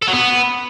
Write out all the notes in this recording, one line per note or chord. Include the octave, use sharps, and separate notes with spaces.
A4
F#3
B3